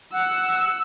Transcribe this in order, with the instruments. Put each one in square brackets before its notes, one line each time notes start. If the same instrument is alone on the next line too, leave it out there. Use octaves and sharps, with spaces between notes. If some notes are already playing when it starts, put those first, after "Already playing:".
[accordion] F#5 [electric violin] E6